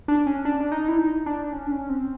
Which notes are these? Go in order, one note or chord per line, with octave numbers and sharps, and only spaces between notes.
D4
C#4
D4
D4
D#4
E4
D#4
D4
C#4
D4
C#4
C4